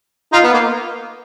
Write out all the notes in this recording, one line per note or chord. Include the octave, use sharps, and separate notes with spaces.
D#4 F4
B3
A#3